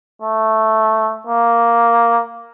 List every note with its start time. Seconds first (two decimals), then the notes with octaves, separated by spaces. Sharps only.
0.22 A3
1.27 A#3